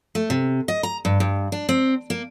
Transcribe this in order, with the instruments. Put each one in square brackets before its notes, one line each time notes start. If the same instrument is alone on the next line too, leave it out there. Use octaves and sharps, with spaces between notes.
[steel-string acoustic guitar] A3
C3
D#5
A#5
G2
G2
D4
C4
A#3